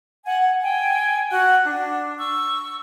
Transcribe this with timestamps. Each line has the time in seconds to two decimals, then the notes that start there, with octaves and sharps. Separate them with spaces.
0.25 F#5 G#5
0.62 G5 G#5
1.30 F#4 F#5 F#6
1.64 D4
2.18 C#6 E6